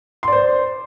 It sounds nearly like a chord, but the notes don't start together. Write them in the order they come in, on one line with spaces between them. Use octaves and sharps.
C6 D5 C5